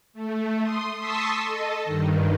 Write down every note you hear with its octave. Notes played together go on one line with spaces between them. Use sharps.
A3
C6 D#6
A5 C6 C#6 D#6 E6 B6
A4 D#5
G2 D#3